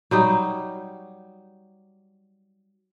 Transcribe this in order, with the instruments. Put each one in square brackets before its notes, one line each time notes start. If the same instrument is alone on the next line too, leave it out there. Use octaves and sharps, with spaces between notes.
[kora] F#3 G3 D#4